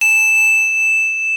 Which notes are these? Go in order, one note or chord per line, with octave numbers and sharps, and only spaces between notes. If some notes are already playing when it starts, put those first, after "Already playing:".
E7